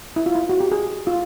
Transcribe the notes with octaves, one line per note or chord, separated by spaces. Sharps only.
E4
F4
E4
F#4
G4
G#4
F4